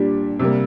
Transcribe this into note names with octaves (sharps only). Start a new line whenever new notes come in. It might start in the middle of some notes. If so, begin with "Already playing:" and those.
Already playing: A#2 G3 D4 G4
C3 G3 A#3